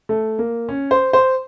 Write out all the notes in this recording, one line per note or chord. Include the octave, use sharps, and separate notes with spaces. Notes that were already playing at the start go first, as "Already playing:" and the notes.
A3
A#3
C#4
C5
C5